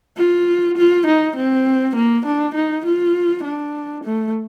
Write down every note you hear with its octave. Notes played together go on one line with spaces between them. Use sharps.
F4
F4
D#4
C4
A#3
D4
D#4
F4
D4
A3